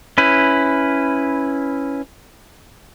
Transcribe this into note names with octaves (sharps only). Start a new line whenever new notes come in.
C#4 E4 B4